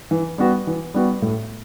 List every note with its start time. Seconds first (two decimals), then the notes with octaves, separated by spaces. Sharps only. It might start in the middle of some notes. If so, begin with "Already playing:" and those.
0.11 E3
0.38 G3 B3 F#4
0.67 E3
0.94 G3 B3 F#4
1.22 A2